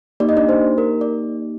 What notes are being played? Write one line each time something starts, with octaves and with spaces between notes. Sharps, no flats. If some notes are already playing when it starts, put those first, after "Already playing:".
A#3 D#4 G4 D5
D#5
D4 D5
C5
A#4
D5